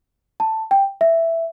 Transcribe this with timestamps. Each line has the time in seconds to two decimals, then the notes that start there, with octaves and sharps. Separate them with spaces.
0.40 A5
0.71 G5
1.01 E5